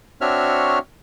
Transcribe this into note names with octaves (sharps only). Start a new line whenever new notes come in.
C4 D4 F#4 C#5 E5 F6